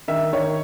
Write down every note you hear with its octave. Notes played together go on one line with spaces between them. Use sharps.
D#3 E5
D#3 C#5